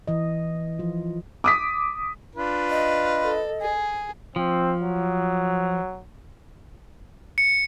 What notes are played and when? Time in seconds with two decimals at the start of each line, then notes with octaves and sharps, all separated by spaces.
0.08 E3 D#5
0.79 F3 F4
1.44 D6 D#6 B6
2.35 D4 F4 B4
2.70 D#5
3.23 A4
3.61 G#4
4.36 F3 C4
4.82 F#3
7.38 C#7